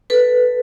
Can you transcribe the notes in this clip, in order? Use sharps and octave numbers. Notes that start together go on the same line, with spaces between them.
A4 B4